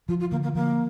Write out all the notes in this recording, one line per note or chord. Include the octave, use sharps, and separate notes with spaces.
F3 F4
F4
D3 A#3
A#3
F3 A#3